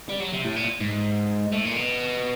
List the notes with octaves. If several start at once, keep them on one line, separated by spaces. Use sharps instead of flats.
G3
F#3
C3
A2
A#2
G#2
A2
A#2
B2